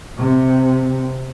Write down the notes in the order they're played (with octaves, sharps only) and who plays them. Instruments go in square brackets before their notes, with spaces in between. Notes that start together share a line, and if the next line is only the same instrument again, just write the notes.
[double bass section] C3